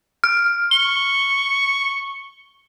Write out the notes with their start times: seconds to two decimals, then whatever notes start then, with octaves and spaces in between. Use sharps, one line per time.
0.24 F6
0.71 C#6 G7